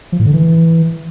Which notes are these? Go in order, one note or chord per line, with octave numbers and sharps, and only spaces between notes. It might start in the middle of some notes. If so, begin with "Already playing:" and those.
F3
A2
D3
E3